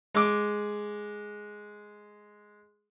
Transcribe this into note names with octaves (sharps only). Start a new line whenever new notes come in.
G#3 D6